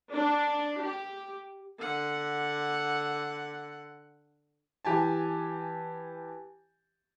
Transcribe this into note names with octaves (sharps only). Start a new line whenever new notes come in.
D4
G4
D3 F#5
E3 G4 G#5 A5